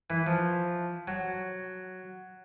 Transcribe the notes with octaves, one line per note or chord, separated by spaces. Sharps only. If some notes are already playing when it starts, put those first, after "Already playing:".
E3
F3
F#3